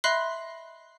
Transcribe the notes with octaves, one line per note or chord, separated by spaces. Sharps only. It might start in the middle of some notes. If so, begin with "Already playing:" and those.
D#5 E5 B5 C6 F#6 C7